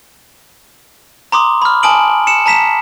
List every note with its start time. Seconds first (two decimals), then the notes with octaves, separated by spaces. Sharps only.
1.32 A#5 C6 D6 D#6
1.62 B5 F6
1.83 G#5 A5 D#6 D7 F#7
2.27 C#7 E7
2.46 A5 A#5 B6 E7